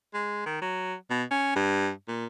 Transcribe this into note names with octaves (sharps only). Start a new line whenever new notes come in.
G#3
D#3
F#3
B2
C#4
G2
A#2